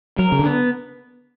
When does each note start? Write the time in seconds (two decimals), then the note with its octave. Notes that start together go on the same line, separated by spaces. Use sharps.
0.19 F#3 A#4
0.32 C#3
0.39 D3
0.46 B3